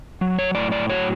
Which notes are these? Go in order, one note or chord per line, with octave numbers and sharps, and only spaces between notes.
F#3
C#5
A2 D5
D5
F#3 C#5